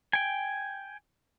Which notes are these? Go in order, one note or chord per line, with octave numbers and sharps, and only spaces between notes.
G5 G#5